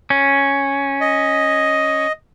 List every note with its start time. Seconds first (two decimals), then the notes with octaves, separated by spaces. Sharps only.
0.10 C#4
1.01 D#5